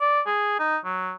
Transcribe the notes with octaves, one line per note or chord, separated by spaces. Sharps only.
D5
G#4
D#4
F#3